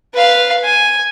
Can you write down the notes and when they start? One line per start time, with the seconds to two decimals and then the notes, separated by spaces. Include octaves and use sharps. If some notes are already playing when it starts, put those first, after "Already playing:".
0.14 B4 F5
0.64 G#5